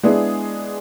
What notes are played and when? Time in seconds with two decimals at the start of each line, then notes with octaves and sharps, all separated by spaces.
0.03 G#3 B3 D4 E4 G#4